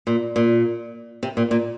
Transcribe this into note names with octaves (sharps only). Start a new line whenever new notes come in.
A#2
A#2
C3
A#2
A#2